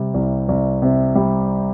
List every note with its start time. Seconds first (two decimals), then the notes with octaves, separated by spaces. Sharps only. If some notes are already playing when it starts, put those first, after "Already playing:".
Already playing: C3 G3
0.14 C2
0.49 C2
0.82 C3
1.15 G3